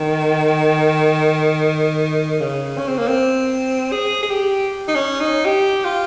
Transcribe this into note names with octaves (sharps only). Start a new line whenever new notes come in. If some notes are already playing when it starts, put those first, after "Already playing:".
Already playing: D#3
C#3
C#4
C4
A#3
C4
G#4
G#4
G4
D#4
C#4
D#4
G4
F4